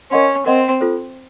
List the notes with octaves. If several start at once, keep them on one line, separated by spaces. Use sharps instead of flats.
C#4 A#4 D#5 F#5 C6
C4 A#4 D#5 F#5 C6
F4 A4 C5